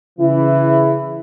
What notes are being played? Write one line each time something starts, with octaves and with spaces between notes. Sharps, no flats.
C#3 E3 E4